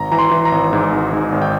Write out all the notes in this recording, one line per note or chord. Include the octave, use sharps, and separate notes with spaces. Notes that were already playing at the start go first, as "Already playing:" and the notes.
Already playing: G#1 A#5
E3 A#5
C6
E3
A#5
G#1
G#2
G#1
G#2
G#1
G5